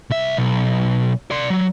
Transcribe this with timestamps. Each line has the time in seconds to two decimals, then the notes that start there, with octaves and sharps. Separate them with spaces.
0.10 C2 E5
0.37 B1
1.31 D5 C6
1.50 F#3